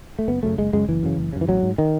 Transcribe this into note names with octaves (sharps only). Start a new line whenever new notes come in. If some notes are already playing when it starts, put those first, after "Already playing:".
A3
F#1 B3
F#2 C#3 A3
F#1 G#3
F#2 C#3 G#3
F#1 E3
F#2 C#3
F#1
F#2 C#3
E3
A1 F#3
G#2
D#3